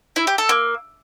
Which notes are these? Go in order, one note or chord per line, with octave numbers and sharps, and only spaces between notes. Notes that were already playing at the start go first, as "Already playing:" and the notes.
E4
G4
A4
A#3